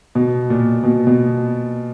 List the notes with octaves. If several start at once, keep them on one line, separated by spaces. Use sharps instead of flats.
B2
A#2
B2
B2